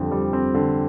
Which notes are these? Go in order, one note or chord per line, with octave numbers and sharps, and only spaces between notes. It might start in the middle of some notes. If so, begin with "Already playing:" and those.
Already playing: F2 D3 G3 C4
G3
C4
D3